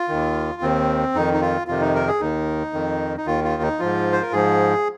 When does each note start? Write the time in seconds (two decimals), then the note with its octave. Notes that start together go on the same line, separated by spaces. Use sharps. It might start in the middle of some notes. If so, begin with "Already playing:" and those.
Already playing: F4
0.08 D#2 D#3
0.62 D#2 D#3 C4
1.15 F2 D#3 D#4
1.33 D#4
1.41 F4
1.68 F2 C3 D#3 F4
1.80 D#4
1.95 A#4
2.07 G#4
2.20 D#2 D#3 D#4
2.73 F2 D#3
3.17 D#4
3.26 D#2 D#3 F4
3.44 F4
3.62 D#4
3.79 G#2 F3 F4
4.12 C5
4.22 A#4
4.32 G#2 F3 G#4